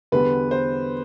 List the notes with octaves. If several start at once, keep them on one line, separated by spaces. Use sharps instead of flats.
E2 D3 G3 B3 B4
C5